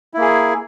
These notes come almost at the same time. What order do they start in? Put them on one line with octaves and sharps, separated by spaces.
E4 A#3 G#4